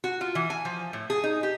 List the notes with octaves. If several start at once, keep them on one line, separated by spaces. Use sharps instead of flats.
F#4
F4
E3
G#5
F3
A2
G#4
D#4
G4